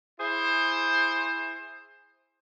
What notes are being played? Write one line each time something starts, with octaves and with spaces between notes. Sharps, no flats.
E4 G#4 C5